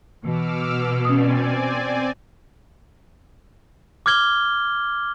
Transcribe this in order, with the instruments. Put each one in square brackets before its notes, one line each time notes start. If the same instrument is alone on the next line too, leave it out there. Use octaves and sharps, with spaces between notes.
[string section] B2 [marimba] E3 [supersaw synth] D6 E6 F6
[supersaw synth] C4 D5 G#5 [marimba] C#4 D#6
[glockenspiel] D6 F6 G#6 G7